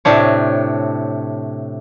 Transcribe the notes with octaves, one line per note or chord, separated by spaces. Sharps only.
A2 C3 D4 C#5